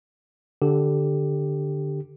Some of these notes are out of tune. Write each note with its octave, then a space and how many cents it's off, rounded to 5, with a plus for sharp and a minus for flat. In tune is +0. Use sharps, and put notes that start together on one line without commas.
D3 +0 G4 +0